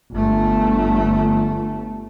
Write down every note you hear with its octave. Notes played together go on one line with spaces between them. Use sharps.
G1 A3